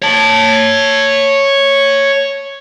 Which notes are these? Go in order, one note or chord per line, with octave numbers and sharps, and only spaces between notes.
C#5 A5